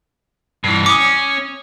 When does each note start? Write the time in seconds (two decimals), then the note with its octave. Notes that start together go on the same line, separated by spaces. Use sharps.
0.64 G2 E3
0.86 C#4 D6 D#6